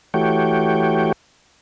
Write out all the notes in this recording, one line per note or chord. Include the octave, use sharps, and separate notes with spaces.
E3 A3 F#4 G4 C#5 G5